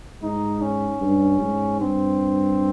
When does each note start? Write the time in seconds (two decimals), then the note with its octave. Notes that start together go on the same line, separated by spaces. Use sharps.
0.22 G#2 D#4
0.61 C#4
1.01 G2
1.41 G#2
1.80 G2 C4